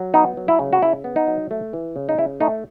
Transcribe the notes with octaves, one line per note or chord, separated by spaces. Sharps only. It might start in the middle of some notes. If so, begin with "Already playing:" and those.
Already playing: F#3
B3 D#4
F#3
E4
C#3
F#4
C#3 E4
B3
D#4
F#3
A3
E3
C#3
D#4
C#3 E4
A3 D#4